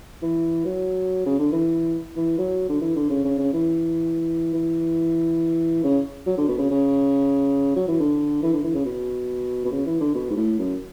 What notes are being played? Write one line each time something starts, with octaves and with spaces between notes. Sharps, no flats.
E3
F#3
C#3
D3
E3
E3
F#3
D3
E3
D3
C#3
C#3
C#3
E3
E3
C#3
F#3
D3
B2
C#3
C#3
F#3
E3
D3
E3
D3
E3
C#3
B2
B2
C#3
E3
D3
B2
G#2
A2
F#2